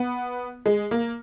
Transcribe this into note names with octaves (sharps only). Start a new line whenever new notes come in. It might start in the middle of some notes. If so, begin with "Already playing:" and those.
Already playing: B3
G#3
A#3